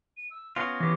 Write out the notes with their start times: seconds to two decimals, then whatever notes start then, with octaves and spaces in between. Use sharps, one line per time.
0.17 D#7
0.30 E6
0.56 B3 C#4 F4 A#6
0.80 E3 G4 A#6